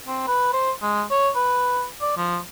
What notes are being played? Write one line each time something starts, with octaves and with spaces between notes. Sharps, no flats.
C4
B4
C5
G#3
C#5
B4
D5
F3